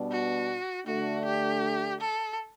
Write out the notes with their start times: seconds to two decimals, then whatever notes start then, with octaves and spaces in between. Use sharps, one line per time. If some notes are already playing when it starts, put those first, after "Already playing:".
Already playing: B2 G3 B3 D4
0.11 F#4
0.86 D3 A3 D4 F#4
1.25 G4
2.01 A4